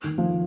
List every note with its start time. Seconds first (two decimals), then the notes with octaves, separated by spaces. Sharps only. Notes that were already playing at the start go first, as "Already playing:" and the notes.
0.04 D#3
0.18 F3